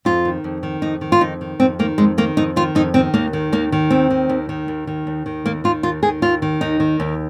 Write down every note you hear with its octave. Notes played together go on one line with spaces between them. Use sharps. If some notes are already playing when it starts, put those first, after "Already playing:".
F2 F4
D#3
F2
D#3
F2 D#4
D#3
F4
F2 D#4
D#3
F2 C4
D#3 A#3
F2 G#3
D#3 A#3
F2 D#4
D#3 F4
F2 D#4
D#3 C4
D#2 A#3
D#3
D#2 A#3
D#3
D#2 C4
D#3
D#2
D#3
D#2
D#3
D#2
D#3
D#2 A#3
D#3 F4
D#2 F4
D#3 G#4
D#2 F4
D#3
D#2 D#4
D#3
D#2